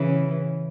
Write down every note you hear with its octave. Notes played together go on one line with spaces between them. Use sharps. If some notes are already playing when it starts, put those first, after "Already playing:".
Already playing: C#3 E3